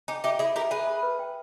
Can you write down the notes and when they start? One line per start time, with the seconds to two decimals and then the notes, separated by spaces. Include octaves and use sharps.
0.08 D#4 G4 G#5
0.24 D#4 G4 E5
0.39 E4 G#4 E5
0.55 G4 A#4 E5
0.71 G#4 B4 E5
0.87 B5
1.03 B4
1.19 G5